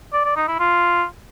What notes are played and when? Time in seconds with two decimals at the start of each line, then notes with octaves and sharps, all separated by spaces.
0.13 D5
0.25 D5
0.36 D#4
0.48 E4
0.59 F4